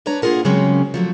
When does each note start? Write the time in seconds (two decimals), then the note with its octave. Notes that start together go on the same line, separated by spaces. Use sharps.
0.06 D4 B4 C#5 A#5
0.22 A#3 F4 G#4 A#4 F#5
0.45 C#3 F#3 G#3 A#3 C4 C#4
0.94 F3 F#3 A3